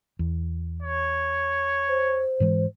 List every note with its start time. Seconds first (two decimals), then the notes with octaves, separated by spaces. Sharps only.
0.19 E2
0.82 C#5
1.89 C5
2.40 G#2 E3 G#3